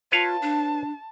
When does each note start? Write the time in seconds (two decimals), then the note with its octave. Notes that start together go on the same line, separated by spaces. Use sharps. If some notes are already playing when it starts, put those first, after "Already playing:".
0.12 F4 B4 C#5 F5 A5
0.42 D4